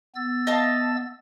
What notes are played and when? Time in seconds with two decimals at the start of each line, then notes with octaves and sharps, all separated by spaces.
0.16 B3 E6 A6
0.47 D#5 F5 A5